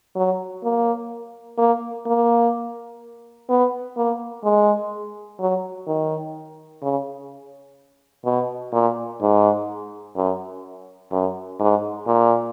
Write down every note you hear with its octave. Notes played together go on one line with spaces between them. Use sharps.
F#3
A#3
A#3
A#3
B3
A#3
G#3
F#3
D#3
C#3
B2
A#2
G#2
F#2
F#2
G#2
A#2